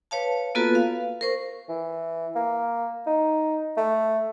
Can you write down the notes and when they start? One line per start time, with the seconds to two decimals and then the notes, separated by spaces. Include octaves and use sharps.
0.11 B4 C#5 F5 A5
0.55 A#3 B3 F4 F#4 A4 B4
0.75 F5
1.21 A#4 C5 C#6
1.69 E3
2.36 A#3
3.07 D#4
3.77 A3